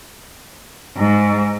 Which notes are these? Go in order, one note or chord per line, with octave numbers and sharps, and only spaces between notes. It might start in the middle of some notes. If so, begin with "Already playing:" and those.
G#2